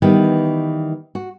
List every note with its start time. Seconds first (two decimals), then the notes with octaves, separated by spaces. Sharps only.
0.02 D#3 E3 G3 B3
1.15 F#4